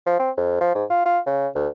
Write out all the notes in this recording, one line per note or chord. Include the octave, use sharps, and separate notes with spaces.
F3
C4
F2
F3
G#2
F4
F4
C#3
D2